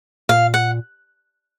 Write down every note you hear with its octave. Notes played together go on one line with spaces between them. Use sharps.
A#2 F5
F#5